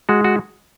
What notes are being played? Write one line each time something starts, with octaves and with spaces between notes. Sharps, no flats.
G#3 F#4
F#4